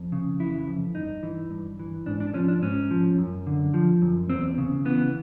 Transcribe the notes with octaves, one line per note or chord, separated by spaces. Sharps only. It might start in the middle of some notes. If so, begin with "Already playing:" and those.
Already playing: F2
C#3
E3 E4
F2
G2 D#4
E3
G2
E3
G#2 D4
D4
F3 C#4
D4
G#2 C#4
F3
F#2
D3
F3
F#2
E2 C4
C#3
E3 B3